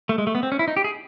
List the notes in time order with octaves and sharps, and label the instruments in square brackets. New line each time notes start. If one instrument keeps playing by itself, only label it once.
[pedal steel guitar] A3
G#3
A3
B3
C4
C#4
E4
D#4
G4
G#4